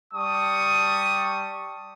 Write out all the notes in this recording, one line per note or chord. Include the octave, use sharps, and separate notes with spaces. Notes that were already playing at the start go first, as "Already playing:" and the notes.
G3 A5 C#6 D#6